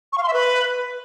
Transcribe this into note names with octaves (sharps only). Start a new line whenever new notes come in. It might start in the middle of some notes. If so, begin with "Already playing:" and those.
C#6
F5
C6
E5
B4